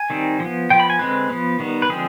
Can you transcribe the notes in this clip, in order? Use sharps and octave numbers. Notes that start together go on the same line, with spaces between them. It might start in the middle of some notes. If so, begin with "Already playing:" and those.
Already playing: G#5
D#3 G3 C4
F3
B3
F3 B3 G5
B5
G#5
D3 G#3 C4 B4
F3 B3
D#3 G3 B3
B4
D3 F3 G#3 C4 G#4